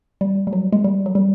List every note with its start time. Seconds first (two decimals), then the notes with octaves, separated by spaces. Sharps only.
0.21 G3
0.47 G3
0.53 F#3
0.73 G#3
0.84 G3
1.06 F#3
1.15 G3